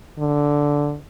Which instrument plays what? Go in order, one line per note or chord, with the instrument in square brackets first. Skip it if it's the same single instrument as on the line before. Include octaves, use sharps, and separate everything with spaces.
[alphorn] D3